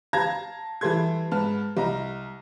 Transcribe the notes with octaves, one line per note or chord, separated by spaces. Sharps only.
F5 A5 A#5 G#6 A#6
E3 G3 A4 C6 G#6
G#2 B4 A5 F6
C2 D#5 A#5